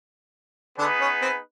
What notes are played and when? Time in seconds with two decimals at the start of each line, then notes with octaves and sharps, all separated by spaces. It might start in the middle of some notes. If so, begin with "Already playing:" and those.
0.78 D3 B3 D4 D#4 G#4 B4
1.01 C#4
1.21 C4